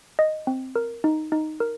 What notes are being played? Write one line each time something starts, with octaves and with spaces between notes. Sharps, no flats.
D#5
C4
A#4
D#4
D#4
A#4